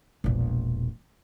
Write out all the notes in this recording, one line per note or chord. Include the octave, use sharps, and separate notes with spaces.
E1 A#1